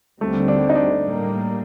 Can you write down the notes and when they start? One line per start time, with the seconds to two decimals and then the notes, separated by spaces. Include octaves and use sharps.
0.21 D#2 D3 G3 A3 C4
0.48 D4
0.69 D#4
0.75 D4
1.03 A2 G3 A#3